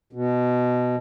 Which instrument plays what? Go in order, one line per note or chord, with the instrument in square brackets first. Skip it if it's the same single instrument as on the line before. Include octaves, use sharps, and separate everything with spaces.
[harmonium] B2